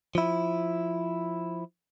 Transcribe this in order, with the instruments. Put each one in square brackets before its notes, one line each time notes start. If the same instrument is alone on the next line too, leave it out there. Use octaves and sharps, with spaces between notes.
[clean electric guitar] F3 E4